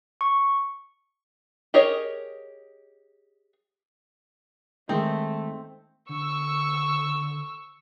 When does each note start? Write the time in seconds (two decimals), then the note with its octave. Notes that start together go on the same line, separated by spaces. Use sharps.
0.21 C#6
1.74 G4 G#4 A#4 C#5 D#5
4.89 D#3 G#3 A3 C4 D#4
6.09 D3 C#6 E6